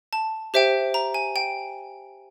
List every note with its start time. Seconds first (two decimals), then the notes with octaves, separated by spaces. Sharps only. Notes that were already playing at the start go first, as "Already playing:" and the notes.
0.13 A5
0.54 G4 C5 E5 G5
0.94 A#5
1.14 G#5
1.36 G5